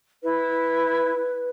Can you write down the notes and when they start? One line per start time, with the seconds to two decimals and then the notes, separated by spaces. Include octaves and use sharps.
0.23 E4 B4